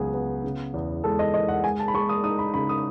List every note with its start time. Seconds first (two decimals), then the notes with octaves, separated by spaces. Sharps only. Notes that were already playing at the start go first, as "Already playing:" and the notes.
Already playing: C#2 F#3 B3 G#4
0.14 B3
0.44 C#3
0.74 E2
1.04 G#3 A4
1.19 D#5
1.34 E2 D#5
1.48 F#5
1.64 G#3 G#5
1.79 A5
1.88 B5
1.94 G#3 C#6
2.09 D#6
2.24 D#4 D#6
2.39 B5
2.54 C#3 B5
2.69 D#6